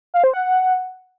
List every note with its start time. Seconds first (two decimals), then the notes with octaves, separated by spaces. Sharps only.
0.14 F5
0.24 C5
0.33 F#5